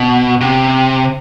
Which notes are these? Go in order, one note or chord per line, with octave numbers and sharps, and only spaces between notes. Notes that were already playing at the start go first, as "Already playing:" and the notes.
Already playing: B2
C3